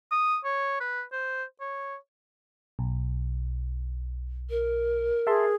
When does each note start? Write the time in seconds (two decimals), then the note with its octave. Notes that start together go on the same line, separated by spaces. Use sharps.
0.12 D#6
0.45 C#5
0.81 B4
1.12 C5
1.61 C#5
2.79 B1
4.50 A#4
5.27 G#4 E5 A5 C6